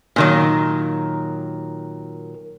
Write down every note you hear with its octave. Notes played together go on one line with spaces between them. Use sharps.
A#2 D#3 F#3